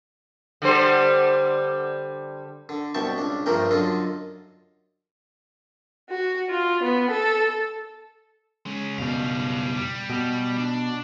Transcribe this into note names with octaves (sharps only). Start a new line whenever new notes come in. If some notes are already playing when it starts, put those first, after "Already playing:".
D3 G3 C5
D3
C2 B2 G5 A5 C#6
C#2 D4
G2 F3 A3 A#3 A#4 G5
F#2 D3 F4 A4 D#5
F#4
F4
B3
A4
G#3 C#4
F#1 B2 G3 F5
G3
B2
D4